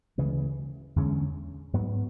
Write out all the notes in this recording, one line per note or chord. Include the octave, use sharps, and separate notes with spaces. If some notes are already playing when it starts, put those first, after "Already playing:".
D2 C#3 E3 G#3
E2 D3 G#3 C#4
G#2 F#3 B3